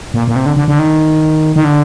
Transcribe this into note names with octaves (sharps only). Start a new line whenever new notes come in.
A#2
A#2
C3
D3
D3
D3
D#3
D#3
D3